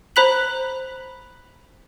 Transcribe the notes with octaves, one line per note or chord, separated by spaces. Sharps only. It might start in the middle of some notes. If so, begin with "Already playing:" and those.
C5 A#5 B5 F#6 B6 F#7